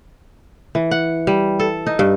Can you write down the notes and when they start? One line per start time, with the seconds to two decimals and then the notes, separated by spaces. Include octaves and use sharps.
0.75 E3
0.91 F#5
1.27 G3
1.60 A4
1.86 D#4
1.99 G2